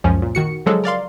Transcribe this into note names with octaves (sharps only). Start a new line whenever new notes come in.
C#2 F#2 F3 C#4
A#2
D#3 F#4 C#7
C#3 F3 F#3 G#3 G#4 A4
A#4 D5 F5 C6